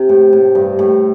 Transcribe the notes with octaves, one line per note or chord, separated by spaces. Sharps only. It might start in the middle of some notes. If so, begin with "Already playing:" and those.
Already playing: C3
A2
A2
G2
A2